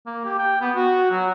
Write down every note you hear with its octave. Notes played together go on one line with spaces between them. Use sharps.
A#3
G4
G5
B3
F#4
F#3